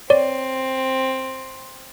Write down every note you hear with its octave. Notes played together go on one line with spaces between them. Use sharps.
C4 C#5 D5